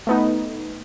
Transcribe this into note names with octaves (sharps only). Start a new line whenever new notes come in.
A3 B3 D#4